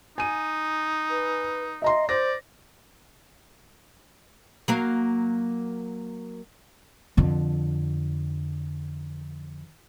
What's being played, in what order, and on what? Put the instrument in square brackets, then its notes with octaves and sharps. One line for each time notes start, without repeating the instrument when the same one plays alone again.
[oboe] D#4 [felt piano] G#5 D#7
[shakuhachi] B4
[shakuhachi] D#5 [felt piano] E5 A#5 C6
[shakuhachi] C5 [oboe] D5 [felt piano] A#6
[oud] F#3 A#3 F5
[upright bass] F2 D3